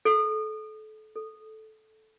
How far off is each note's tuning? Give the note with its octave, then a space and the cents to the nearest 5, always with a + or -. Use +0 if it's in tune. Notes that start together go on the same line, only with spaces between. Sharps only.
A4 -30
A4 -15